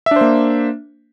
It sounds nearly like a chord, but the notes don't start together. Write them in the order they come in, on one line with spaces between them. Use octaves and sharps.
E5 D4 C5 A#3